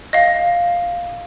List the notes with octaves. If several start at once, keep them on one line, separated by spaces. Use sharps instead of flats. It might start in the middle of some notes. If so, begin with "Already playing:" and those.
D#5 F5